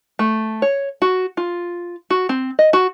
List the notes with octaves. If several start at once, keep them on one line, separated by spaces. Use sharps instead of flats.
A3
C#5
F#4
F4
F#4
C4
D#5
F#4